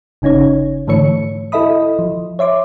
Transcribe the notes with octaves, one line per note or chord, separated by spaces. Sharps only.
G1 C#3 C#4 D#4 C#5
G#2 D3 E3 A3 C#5 C#7
E4 A4 D#5 E5 B5 D#6
F3
C#5 E5 C6 D6